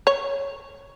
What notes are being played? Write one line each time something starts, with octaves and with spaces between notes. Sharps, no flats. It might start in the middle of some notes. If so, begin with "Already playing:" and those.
C#5